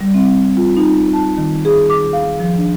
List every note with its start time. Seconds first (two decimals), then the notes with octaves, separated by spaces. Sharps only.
0.01 G3
0.14 C4
0.57 F4
0.77 D#4
1.13 A5
1.38 D#3
1.65 G#4
1.90 D6
2.13 F5
2.40 F3
2.57 D4